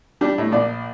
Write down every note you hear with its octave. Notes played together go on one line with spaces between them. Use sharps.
G3 D4 G4
A2
A#1 D5